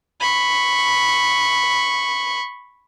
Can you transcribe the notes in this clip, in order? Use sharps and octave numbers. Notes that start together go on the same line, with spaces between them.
B5 C#6